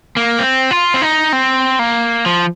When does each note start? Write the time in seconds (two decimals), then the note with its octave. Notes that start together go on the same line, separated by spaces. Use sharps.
0.17 A#3
0.39 C4
0.71 F4
0.94 C4
1.02 D#4
1.33 C4
1.79 A#3
2.26 F3